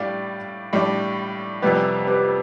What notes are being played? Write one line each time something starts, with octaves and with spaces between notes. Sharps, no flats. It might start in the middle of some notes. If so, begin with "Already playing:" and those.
Already playing: A2 G3 D4 D5 F5
A2 G3 D4
F2 C3 G3 B3 G4 B4
G4 B4